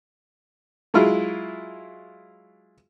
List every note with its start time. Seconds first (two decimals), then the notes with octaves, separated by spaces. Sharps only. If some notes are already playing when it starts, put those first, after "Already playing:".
0.94 F#3 G#3 E4 F4